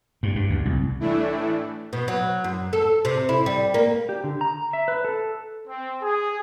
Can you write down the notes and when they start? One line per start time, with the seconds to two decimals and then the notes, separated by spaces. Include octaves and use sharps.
0.23 G2
0.36 G2
0.50 D2
0.65 C2
1.00 A2 E3 A3 D4 E4
1.93 B2
2.08 F#3
2.44 F#2
2.73 A4
3.05 C3
3.29 E4
3.46 G3
3.74 A#3
4.09 G4
4.24 D3
4.41 A#5
4.73 E5
4.88 B4
5.05 A4
5.67 C4
6.02 G#4